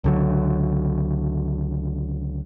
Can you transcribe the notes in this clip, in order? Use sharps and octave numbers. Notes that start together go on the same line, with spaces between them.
C#2 D3 F#3